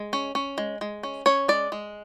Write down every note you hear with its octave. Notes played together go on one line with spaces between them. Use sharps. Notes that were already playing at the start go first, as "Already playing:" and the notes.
Already playing: G#3
C#4
C#4
G#3
G#3
C#4
C#4 C#5
G#3 D5
G#3